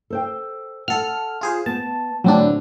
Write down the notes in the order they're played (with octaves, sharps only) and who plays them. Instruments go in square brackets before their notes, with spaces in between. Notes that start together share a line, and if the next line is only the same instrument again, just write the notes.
[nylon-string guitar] A4 C5 G5
[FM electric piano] A4 F6 [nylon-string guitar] F#5
[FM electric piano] F4 G#4 C5
[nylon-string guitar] B3 [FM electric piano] A5
[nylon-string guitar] A2 D3 [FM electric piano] F#3 C4 D4